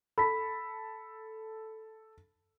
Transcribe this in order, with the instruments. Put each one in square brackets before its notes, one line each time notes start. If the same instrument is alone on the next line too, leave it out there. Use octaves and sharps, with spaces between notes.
[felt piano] A4 [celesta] B5 B6